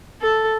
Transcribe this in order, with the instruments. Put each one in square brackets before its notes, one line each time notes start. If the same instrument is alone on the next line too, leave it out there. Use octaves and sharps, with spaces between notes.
[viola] A4